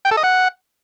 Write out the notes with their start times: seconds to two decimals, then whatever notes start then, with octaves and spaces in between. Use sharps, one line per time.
0.05 G5
0.11 A4
0.17 D#5
0.23 F#5